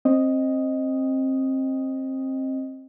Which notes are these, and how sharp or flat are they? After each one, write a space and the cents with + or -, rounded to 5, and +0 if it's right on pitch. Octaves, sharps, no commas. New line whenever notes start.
C4 +25 D#5 +0